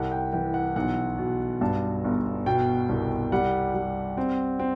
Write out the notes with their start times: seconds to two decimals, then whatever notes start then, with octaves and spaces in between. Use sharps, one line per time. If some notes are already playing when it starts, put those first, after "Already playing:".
Already playing: C2 F#5
0.12 G5
0.33 E3 G5
0.54 F#5
0.76 B1 F#5
1.18 B2
1.61 G2 A5
2.04 G1
2.46 B2 G5
2.89 C2
3.32 G3 F#5
3.74 G3
4.17 C4
4.59 C4